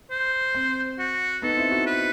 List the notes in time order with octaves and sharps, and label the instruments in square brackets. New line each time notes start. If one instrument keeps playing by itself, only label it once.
[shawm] C5
[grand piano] C4
[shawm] F#4
[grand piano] B3 D#4 [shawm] A4
[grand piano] C4 E4
D#4 F#4
[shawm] B4